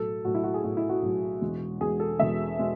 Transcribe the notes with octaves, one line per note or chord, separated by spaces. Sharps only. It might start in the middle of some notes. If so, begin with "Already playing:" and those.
Already playing: B1 A2 F#3 A4
B1 A2 F#3 F#4
E4
F#4
G#4
B1 A2 F#3 F#4
E4
F#4
B1 A2 F#3
E1 E2 B2 G#3
E1 E2 B2 G#3 G#4
A4
E1 E2 B2 G#3 E5
B2 G#3